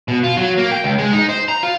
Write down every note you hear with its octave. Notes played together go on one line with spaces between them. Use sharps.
B2
F4
F#3
A#3
G5
C#2
G#3
D#4
C5
A#5
F4